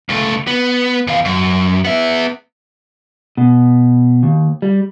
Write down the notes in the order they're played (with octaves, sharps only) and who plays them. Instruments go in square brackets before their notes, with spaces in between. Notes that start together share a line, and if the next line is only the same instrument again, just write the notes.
[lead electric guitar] C#2 A3
B3
E2 F5
F#2
B3 E5
[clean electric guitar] B2
D#2
G3